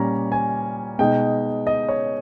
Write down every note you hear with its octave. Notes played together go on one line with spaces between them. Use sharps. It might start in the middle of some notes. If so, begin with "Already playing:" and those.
Already playing: A#2 G3 C#4 A#5
G#5
B2 G#3 D#4 G5
D#5
C#5